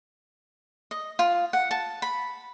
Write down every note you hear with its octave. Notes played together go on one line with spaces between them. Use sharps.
D#5
F4
F#5
A5
B5